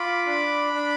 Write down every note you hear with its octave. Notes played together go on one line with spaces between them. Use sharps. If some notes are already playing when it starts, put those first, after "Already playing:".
Already playing: F4 B5 D6
D4
D4